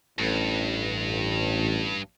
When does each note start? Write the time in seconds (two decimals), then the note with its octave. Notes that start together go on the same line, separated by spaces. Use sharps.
0.19 A1 G2